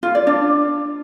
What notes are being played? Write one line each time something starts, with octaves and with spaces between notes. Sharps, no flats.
F4
D5
D4